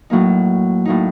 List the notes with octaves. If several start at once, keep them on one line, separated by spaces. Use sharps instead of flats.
A2 F#3 A#3 D#4
A2 F#3 A#3 D#4